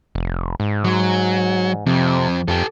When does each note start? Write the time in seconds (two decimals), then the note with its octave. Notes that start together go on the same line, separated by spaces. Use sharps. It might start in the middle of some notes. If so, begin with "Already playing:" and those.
0.15 F1
0.60 G#2
0.84 F#3
1.86 F2 C3
2.48 F2 G4 A4